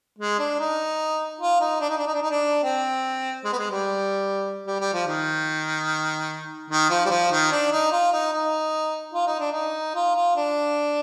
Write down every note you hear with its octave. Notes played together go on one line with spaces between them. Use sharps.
G#3
D4
D#4
F4
D#4
D4
D#4
D4
D#4
D4
D#4
D4
C4
G#3
B3
G#3
G3
G3
G3
F3
D#3
D#3
F3
G3
F3
D#3
D4
D#4
F4
D#4
D#4
F4
D#4
D4
D#4
F4
F4
D4